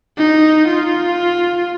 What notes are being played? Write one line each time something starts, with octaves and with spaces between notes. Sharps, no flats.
D#4
F4